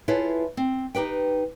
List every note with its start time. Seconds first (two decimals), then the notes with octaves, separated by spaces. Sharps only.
0.08 E4 F4 G#4 A4 B4 C#5
0.57 C4
0.95 D#4 G4 B4 G5